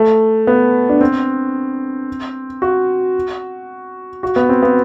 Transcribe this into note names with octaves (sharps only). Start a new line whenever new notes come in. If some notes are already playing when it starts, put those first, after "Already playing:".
Already playing: A3
B3
D4
C4
F#4
F#4
B3
C4
B3